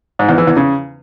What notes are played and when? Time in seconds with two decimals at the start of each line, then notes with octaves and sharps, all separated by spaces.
0.19 G#2
0.29 E2
0.38 E3
0.47 E2
0.57 C#3